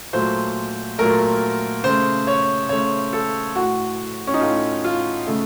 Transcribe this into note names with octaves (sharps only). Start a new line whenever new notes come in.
A#2 F#3 A3 C5
A#2 F#3 A3 A#4
C#3 A3 C5
C#5
C#3 A3 C#5
A4
A2 A3 F#4
C#4
D#4
A2 A3 F4
F4
C#3 A3